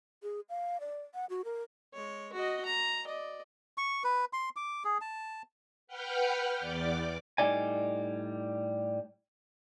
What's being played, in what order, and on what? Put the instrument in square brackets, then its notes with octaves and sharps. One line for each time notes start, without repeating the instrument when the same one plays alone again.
[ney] G#4
F5
D5
F#5
F#4
A#4
[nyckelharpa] G#3 C#5
F#4 D#5
A#5
D5 D#5
[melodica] C#6
B4
C6
D6
G#4
A5
[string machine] B4 F#5 G5 F6 G6
E2 D5 D6
[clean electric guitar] A2 G3 D#4 D5 G#5